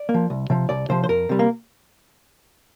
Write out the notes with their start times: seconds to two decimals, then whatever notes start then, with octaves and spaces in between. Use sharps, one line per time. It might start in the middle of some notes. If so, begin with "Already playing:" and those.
Already playing: D5
0.09 A#3
0.14 F3
0.30 C2
0.50 C3 F3
0.69 C2 D5
0.89 C3 F3 C5
1.04 C5
1.09 F2 A#4
1.29 C3 G3
1.39 A#3